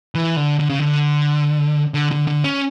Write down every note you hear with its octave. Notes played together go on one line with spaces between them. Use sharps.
E3
D3
D3
C#3
D3
D3
D3
D3
C#4